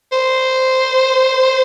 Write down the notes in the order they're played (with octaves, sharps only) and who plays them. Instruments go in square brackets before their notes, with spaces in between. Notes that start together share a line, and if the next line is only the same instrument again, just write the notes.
[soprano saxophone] C5